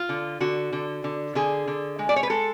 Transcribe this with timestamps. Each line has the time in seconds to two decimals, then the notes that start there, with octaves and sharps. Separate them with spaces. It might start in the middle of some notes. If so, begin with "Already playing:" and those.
Already playing: F4
0.09 D3
0.41 D3 F#4
0.73 D3
1.04 D3
1.35 D3 G#4
1.68 D3
1.99 G#3
2.09 D5
2.16 C#5
2.23 B4
2.30 G#3 A4